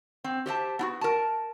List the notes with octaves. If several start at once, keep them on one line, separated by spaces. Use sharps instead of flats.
C4
G4 C5 E5 A5
B3 E4 F#4
A#4 A5